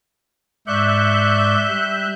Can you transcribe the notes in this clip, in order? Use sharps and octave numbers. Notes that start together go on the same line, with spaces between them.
G#2 D5 E5 C#6 F#6 G6
G3